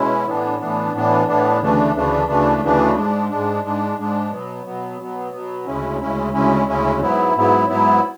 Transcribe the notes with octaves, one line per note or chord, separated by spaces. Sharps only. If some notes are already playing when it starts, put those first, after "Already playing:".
Already playing: B2 G#3 C#4 E4
A2 E3 B3 D4
A2 E3 B3 D4
A2 E3 B3 D4
A2 E3 B3 D4
D2 C#3 E3 A3 D4
D2 C#3 E3 A3 D4
D2 C#3 E3 A3 D4
D2 C#3 E3 A3 D4
G#2 G#3 D4
G#2 G#3 D4
G#2 G#3 D4
G#2 G#3 D4
B2 F#3 B3
B2 F#3 B3
B2 F#3 B3
B2 F#3 B3
D2 C#3 G#3 C#4 E4
D2 C#3 G#3 C#4 E4
D2 C#3 G#3 C#4 E4
D2 C#3 G#3 C#4 E4
G#2 F#3 B3 E4
G#2 F#3 B3 E4
G#2 F#3 B3 E4